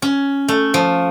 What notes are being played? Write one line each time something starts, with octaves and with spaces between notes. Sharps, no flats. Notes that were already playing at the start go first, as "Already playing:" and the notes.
C#4
A3
F3